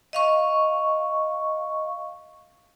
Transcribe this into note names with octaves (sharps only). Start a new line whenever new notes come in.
D#5 F5 C#6